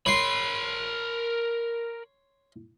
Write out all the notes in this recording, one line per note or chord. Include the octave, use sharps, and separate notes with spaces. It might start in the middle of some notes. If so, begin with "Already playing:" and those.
A#4 C#5 B5 C6